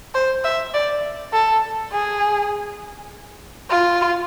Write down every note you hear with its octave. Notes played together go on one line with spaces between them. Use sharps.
C5
E5
D5
A4
G#4
F4